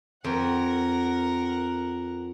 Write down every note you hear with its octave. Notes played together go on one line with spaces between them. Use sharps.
F2 A#4 F#5